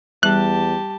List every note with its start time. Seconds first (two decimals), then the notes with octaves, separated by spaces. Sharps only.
0.23 E2 G3 G4 A5 F#6